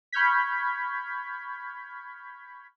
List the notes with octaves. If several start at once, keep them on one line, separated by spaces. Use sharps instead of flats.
B5 C#6 F6 G6 G#6 B6